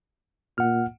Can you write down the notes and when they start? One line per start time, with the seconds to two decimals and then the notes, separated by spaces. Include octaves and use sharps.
0.58 A#2 F#5 F6